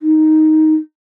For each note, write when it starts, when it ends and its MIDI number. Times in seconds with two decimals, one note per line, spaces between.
0.02 0.75 63